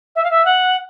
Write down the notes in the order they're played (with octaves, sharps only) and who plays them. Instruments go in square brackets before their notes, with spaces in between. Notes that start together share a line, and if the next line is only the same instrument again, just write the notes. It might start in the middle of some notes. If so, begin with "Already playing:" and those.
[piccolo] E5
F5
E5
F#5